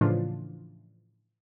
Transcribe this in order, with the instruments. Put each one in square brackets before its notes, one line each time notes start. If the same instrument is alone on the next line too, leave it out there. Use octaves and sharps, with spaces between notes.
[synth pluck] A2 C#3 E3 F3 D4 F4